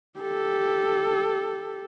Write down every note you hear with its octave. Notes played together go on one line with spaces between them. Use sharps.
G4 A4